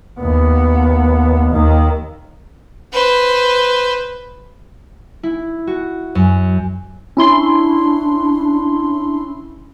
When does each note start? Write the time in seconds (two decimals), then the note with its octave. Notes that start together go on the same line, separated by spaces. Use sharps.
0.20 D#2 B3
1.52 D#2 D#3
2.93 B4 C5
5.23 E4
5.67 F#4
6.15 F#2
7.17 C#4 D4 E4 C6